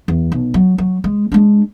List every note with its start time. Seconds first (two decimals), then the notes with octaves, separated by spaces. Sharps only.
0.08 E2
0.32 B1
0.54 F#3
0.78 F#3
1.04 G#3
1.32 G#3 D4